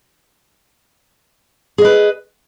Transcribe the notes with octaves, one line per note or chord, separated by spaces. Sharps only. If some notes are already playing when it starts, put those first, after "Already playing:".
G#4 B4 D#5